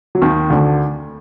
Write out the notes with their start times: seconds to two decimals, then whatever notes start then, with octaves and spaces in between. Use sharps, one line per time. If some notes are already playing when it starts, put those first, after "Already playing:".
0.15 F#3
0.22 D#2 D#3
0.50 D2 D3